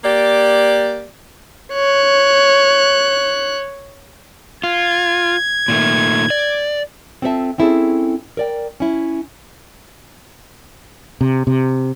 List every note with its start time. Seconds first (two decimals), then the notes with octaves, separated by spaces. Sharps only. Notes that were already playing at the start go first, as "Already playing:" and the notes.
0.04 A#3 G4 D5
1.73 C#5 F#6
4.64 F4 G#6
5.68 A#2 D#3 A3
6.30 D5
7.22 C4 F4 A4 A#4 E5 A5
7.58 C4 C#4 E4 G#4 A4
8.37 A#4 D5 G5
8.80 C#4 E4
11.21 C3
11.47 C3